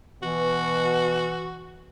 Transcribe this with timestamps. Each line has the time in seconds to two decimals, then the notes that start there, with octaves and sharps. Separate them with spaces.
0.23 B2 E3 F#4